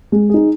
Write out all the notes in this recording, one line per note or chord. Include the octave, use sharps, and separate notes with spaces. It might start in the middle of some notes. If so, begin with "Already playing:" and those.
G#3
D#4 G#4